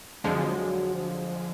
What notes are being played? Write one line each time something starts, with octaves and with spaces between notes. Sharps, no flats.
F2 D3 F3 F#3 G#3
F3